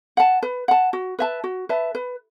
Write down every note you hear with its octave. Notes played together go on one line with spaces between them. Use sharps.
F#5 A5
B4
F#5 A5
F#4
B4 E5 A5
F#4
B4 E5 A5
B4